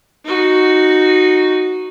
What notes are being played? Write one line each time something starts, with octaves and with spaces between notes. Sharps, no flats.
D#4 F#4